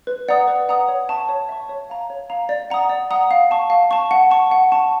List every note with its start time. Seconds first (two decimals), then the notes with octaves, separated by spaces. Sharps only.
0.07 B4
0.28 D5 F#5 A#5 D#6
0.47 B4
0.68 D5 F#5 A#5 D#6
0.89 C#5
1.09 E5 A5 C#6
1.29 C#5
1.49 E5 A5 C#6
1.69 C#5
1.90 F5 A#5
2.10 C#5
2.30 F5 A#5
2.49 D5
2.70 F#5 A#5 D#6
2.89 D5
3.11 F#5 A#5 D#6
3.31 F5
3.51 A5 C#6
3.70 F5
3.91 A5 C#6
4.11 F#5
4.31 A5 C#6
4.51 F#5
4.72 A5 C#6